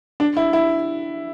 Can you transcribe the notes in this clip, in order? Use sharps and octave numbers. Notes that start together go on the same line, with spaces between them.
D4
E4
E4